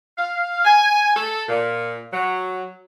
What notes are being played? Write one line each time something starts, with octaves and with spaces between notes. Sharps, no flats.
F5
G#5
A4
A#2
F#3